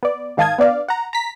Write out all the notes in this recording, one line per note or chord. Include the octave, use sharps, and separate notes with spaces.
B3 D5
G#2 D#3 F5 A5 D#6 G#6
B3 D4 D5 F5
F#5 A#5
A#5 B6